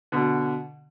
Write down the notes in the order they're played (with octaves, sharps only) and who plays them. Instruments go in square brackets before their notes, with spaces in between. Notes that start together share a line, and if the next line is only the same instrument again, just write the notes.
[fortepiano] B2 D3